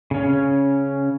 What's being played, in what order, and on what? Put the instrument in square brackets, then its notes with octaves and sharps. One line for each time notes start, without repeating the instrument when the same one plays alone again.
[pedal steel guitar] C#3 C#4